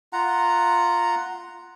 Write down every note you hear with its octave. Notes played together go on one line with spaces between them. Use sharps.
F4 F#5 A#5